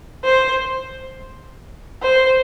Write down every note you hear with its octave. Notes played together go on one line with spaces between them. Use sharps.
C5
C5